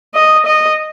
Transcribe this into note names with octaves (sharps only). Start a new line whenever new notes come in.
D#5
D#5